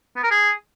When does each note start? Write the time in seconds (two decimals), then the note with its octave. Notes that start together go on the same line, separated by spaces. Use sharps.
0.16 B3
0.24 A#4
0.31 G#4